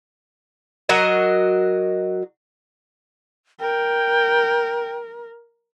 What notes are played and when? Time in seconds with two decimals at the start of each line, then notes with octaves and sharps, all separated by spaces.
0.89 F#3 F#4 A#4 D#5
3.60 A#4 G5